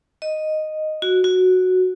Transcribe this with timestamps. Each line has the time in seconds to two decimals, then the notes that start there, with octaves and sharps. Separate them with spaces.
0.22 D#5
1.02 F#4
1.24 F#4